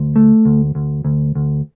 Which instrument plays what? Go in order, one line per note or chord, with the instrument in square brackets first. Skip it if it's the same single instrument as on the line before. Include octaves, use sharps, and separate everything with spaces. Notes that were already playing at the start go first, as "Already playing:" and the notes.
Already playing: [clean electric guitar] D2
A3
D2
D2
D2
D2